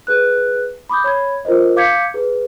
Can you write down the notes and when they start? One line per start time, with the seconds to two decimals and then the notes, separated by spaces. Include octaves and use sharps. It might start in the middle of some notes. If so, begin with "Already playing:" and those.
0.07 G#4 B4 F#6
0.89 B5 D6 D#6 G6
1.04 C#5 B5 G#6
1.45 F4 A#4 C5 D#5
1.76 F5 D6 G6 G#6 B6 C#7
2.14 G#4 B4